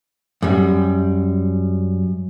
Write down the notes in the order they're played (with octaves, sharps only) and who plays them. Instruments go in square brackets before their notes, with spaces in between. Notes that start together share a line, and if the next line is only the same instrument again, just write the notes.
[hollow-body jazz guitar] F#2 G3